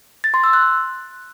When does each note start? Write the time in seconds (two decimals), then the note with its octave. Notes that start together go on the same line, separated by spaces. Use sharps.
0.24 A6
0.34 C6
0.44 E6
0.53 F#6